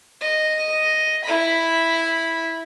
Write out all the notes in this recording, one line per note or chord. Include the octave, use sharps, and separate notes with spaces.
D#5
E4 B5